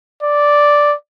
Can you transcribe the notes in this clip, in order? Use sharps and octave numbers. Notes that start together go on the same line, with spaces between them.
D5